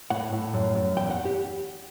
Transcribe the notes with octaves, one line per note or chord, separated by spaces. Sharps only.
A2 F#5
A2
F#2
F#2
E2 G5
F#5
G4